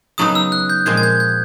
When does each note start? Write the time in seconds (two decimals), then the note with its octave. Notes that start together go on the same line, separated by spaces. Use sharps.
0.18 C#3 F#3 B3 D#4 D#6
0.35 E6
0.52 F#6
0.70 G6
0.86 A#2 F3 G#3 C4 G#6
0.97 G#6
1.03 G6
1.20 G6